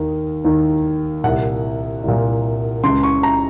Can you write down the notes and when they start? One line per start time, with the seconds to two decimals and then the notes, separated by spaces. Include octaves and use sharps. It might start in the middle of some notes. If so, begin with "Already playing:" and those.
Already playing: D#2 D#3
0.45 D#2 D#3
1.24 C2 A#2 F#5
2.04 C2 A#2
2.84 C#2 C#3 C6
3.03 C#6
3.23 A#5